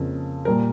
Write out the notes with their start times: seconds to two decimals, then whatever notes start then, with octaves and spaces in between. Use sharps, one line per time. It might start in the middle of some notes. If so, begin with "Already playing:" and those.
Already playing: F2 C#3 F3 A#3
0.45 A#2 G3 A#3 A#4